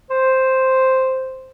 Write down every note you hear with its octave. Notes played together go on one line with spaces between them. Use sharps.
C5